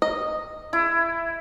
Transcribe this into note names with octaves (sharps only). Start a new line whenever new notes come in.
D#5
E4